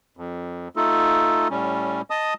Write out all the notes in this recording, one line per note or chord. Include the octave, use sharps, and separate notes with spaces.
F2
A3 D#4 F4 A4
A2 G3 C#4
D#5 A5 D#6